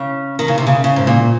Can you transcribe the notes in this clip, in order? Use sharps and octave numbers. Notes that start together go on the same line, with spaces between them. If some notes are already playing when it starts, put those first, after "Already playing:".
Already playing: C#3
D#3
C#3
C3
C#3
C#3
G#2
A#2